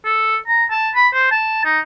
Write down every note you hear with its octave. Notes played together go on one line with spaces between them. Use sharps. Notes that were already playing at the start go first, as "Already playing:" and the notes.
A4
A#5
A5
B5
C5
A5
D#4